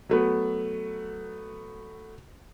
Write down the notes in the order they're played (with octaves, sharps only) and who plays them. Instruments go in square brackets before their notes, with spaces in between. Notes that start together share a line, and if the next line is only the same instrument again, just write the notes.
[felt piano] F#3 A3 B3